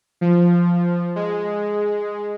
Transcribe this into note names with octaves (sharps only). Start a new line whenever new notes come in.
F3
G#3